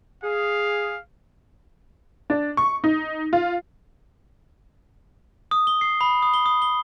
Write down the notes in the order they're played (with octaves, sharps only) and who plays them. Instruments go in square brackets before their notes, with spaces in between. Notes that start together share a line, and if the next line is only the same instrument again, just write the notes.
[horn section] G#4 [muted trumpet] F5
[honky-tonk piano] D4
C#6
D#4
F4
[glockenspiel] D#6
G7
C7
B5
D#6
G7
D#6
G7